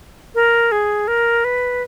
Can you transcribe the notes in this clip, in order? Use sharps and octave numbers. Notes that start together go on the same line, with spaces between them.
A#4
G#4
A#4
B4